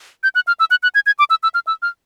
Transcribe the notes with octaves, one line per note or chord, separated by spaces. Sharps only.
G6
F#6
F6
E6
F#6
F#6
G#6
G#6
D6
E6
E6
F6
E6
F6